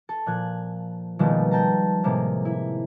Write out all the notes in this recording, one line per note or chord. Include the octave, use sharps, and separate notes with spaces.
A4
A#2 F3 F#6 G#6
B2 D#3 F3 G3 G#3 A#3
G5 A5 A#5
A2 C3 G#3 A#3
E4